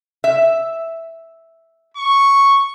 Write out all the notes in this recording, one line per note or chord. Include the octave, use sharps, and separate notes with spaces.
E5
C#6